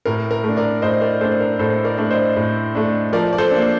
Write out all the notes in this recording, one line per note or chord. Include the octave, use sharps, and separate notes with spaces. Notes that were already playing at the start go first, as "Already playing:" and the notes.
A2 A#4
A#4
A3 D4
A#4 D5
A2 C5 D#5
A#4 D5
A3 D4 A4 C5
A#4
A2 A4 C5
A#4 D5
A3 D4
C5 D#5
A2
A3 D4
F3 A#4 D5
D5
A4 C5
A#3 D4